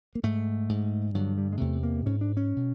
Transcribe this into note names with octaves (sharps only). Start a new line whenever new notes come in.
A#3
G#2 A3
G#2
G2 D3 F#3
G3
G#3
E2 C3 A3
A#3
G#2 C#4
D4
C#4
B2